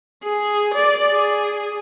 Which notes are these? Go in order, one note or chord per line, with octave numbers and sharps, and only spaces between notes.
G#4
D5
G#4